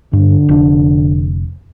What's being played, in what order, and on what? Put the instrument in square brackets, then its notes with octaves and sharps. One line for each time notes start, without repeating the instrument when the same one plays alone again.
[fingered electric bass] G2 [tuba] D3
[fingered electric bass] F1 D4